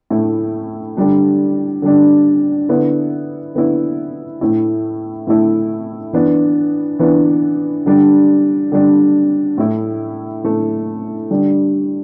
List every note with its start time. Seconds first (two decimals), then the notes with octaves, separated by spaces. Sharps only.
0.10 A2 A3 E4
0.97 D3 G3 D4
1.82 D3 G3 D4
2.69 D3 B3 E4
3.55 D3 B3 E4
4.41 A2 A3 E4
5.27 A2 A3 E4
6.13 E3 B3 D4
6.99 E3 B3 D4
7.86 D3 G3 D4
8.72 D3 G3 D4
9.58 A2 A3 E4
10.44 A2 A3 E4
11.30 D3 G3 D4